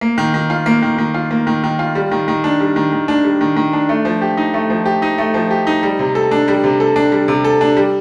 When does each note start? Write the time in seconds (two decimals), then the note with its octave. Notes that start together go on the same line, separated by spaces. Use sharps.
0.01 A#3
0.18 D#3
0.34 D#3
0.50 F4
0.66 A#3
0.82 D#3
0.98 D#3
1.14 F4
1.31 A#3
1.47 D#3
1.64 D#3
1.79 F4
1.95 G3
2.11 D#3
2.28 D#3
2.44 D4
2.60 G3
2.76 D#3
2.92 D#3
3.08 D4
3.24 G3
3.41 D#3
3.56 D#3
3.73 D4
3.89 A3
4.05 F3
4.22 G4
4.37 D#4
4.54 A3
4.70 F3
4.86 G4
5.02 D#4
5.18 A3
5.34 F3
5.51 G4
5.67 D#4
5.83 G3
5.99 C3
6.15 A4
6.31 D4
6.48 G3
6.64 C3
6.80 A4
6.96 D4
7.12 G3
7.28 C3
7.44 A4
7.61 D4
7.77 G3